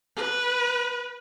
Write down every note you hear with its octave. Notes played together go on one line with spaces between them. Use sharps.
B4